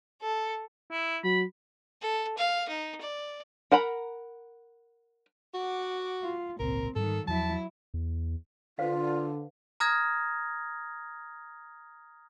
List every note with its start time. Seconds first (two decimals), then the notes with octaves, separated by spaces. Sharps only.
0.21 A4
0.91 E4
1.24 F#3 B5
2.01 A4
2.37 F5
2.68 D#4
3.01 D5
3.72 A#4 F#5 A#5 B5
5.54 F#4 F#5 D6
6.23 F4
6.59 G#1 C#2 A#2 C4 A#4
6.96 G#2 D#3 G3 A4
7.28 E2 F3 F#3 E4 A5
7.94 E2
8.79 D3 F4 B4 C5 F5
9.80 A#5 D#6 F6 G#6 A#6